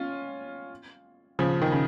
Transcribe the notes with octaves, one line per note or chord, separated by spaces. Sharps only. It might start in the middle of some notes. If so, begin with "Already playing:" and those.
Already playing: C#4 F4
C#3 F3
D#3
C#3